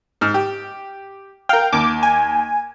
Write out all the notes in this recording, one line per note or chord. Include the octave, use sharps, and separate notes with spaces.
G#2 F6
G4
A#4 F5 G5
D#2 D6
G#5